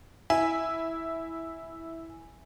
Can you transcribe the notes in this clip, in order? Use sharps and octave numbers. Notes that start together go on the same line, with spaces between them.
E4 G#5